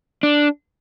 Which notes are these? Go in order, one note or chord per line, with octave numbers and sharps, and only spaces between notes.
D4